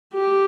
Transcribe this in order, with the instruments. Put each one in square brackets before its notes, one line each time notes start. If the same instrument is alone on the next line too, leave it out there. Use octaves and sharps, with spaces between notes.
[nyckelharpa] G4